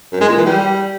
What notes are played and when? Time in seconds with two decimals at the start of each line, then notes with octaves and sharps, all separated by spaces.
0.12 F#2
0.21 G#3
0.29 A#2
0.37 E3
0.45 G3